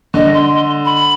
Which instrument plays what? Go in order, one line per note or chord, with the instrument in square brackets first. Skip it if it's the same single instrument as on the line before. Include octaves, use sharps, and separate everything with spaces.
[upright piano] D3 [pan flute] D#5
[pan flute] C6
B5